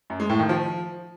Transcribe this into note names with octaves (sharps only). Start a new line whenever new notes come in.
F#2
G#3
A2
D#3
F3